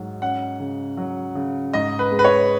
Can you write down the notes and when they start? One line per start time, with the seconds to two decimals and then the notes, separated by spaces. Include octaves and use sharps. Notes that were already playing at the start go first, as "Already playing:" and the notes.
Already playing: G#2 F#3
0.22 C#4 F#5
0.60 C#3
0.97 F#3
1.35 C#3
1.74 G#2 D#5
1.99 B4
2.11 G#3
2.19 B4
2.24 C#5